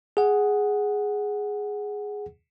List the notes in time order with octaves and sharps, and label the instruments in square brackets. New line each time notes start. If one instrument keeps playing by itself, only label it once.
[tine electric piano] G#4 F#5